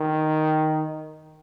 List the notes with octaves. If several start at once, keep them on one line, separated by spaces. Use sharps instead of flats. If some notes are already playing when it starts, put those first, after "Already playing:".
Already playing: D#3